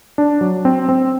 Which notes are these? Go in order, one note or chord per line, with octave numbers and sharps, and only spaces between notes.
D4
F#3
C4
C4